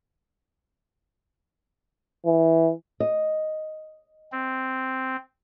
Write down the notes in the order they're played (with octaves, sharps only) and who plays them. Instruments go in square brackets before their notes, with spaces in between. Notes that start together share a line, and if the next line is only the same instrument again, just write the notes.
[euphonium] E3
[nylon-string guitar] D#5
[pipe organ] C4